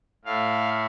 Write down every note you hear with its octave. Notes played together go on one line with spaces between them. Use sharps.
A2 A3 F5